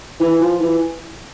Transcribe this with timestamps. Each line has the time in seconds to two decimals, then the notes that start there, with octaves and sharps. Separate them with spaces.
0.20 E3
0.41 F3
0.60 E3